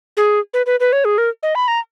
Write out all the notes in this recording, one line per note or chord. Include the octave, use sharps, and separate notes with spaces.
G#4
B4
B4
B4
C#5
G#4
A#4
D#5
B5
A#5